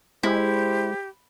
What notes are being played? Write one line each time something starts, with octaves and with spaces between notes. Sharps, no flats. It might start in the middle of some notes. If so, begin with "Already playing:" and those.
G#3 E4 G4 C5